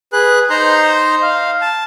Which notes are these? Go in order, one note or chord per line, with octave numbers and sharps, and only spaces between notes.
G#4 B4 F#6
D#4 C5 A#5 C6
F5
A5